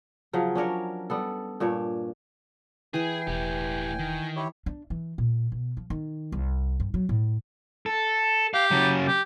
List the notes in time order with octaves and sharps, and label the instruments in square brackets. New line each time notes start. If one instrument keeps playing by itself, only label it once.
[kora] C#3 F3 F#3
C#4 D4 A#4 C#5
G3 B3 A4
G2 A#2 D4 C#5
[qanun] E3 B4 [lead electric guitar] G#4 [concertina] G5 G#5
[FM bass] E1 [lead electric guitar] A2 G4
[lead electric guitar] D#3
[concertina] E4 G4 C#5
[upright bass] D4
E3
A#2
B2
F3
D#3
C2
G2
F#3
A2
[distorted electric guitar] A4
[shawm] G4 [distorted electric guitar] F5
[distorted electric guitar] C#3 F#3
[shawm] G4